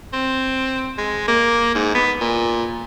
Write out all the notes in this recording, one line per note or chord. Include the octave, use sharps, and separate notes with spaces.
C4
G#3
A#3
G#2
B3
A#2